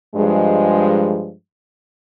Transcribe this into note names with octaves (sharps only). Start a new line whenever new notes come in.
G2 F3 G#3